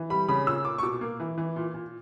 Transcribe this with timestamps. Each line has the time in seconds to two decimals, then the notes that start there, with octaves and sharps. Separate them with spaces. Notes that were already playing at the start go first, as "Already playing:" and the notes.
Already playing: E3
0.10 G3 B5
0.28 C#3 B5
0.47 A#2 E6
0.65 A#2 D6
0.78 C#6
0.83 B2 D6
1.01 A#3
1.20 E3
1.38 E3
1.56 A#2
1.74 A#2